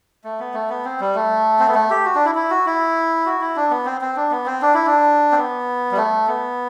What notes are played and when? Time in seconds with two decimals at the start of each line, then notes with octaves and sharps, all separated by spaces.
0.24 A3
0.40 B3
0.54 A3
0.70 B3
0.85 C4
1.00 G3
1.15 A3
1.59 C4
1.67 B3
1.75 A3
1.90 G4
2.05 F#4
2.15 D4
2.25 E4
2.35 E4
2.50 F#4
2.66 E4
3.26 F#4
3.41 E4
3.56 D4
3.70 B3
3.85 C4
4.01 C4
4.16 D4
4.31 B3
4.46 C4
4.62 D4
4.74 E4
4.86 D4
5.32 C4
5.36 B3
5.91 G3
5.97 A3
6.27 B3